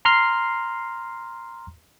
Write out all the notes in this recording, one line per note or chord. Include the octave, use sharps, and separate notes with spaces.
A#5 C6 F6 C7